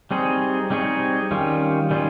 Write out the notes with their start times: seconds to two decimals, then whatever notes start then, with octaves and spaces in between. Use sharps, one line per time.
0.11 G3 C4 D#4 G#4 C#5
0.70 G3 C4 D#4 G#4 C#5
1.31 D#3 G3 C#4 F4
1.91 D#3 G3 C#4 F4